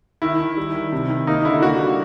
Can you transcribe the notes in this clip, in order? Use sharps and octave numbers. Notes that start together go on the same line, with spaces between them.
D#3 E4
D#3
G3
D#3
C3
D#3
A#3 D#4
D3 E4
A#3 F#4
G3